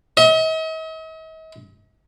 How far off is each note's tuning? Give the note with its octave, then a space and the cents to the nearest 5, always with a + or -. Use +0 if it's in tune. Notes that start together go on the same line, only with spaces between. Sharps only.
D#5 +45